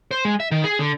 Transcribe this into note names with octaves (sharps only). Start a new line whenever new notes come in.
C5
G#3
E5
D#3
G#4
D3